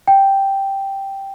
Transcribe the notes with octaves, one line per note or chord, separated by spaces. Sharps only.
G5